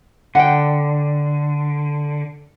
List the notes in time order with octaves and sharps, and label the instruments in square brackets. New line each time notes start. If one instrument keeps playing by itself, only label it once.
[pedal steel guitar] D3 [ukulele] F#5 G5